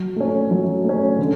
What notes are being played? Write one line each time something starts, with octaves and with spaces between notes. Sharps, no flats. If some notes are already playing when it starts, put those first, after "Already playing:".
Already playing: F#3
A3 C#4
F#3
A3 C#4
D3